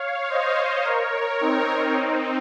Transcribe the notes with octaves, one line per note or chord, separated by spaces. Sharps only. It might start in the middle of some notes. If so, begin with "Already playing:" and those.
Already playing: C#5 F5
C5 D#5
A#4 C#5
C4 D#4
C4 D#4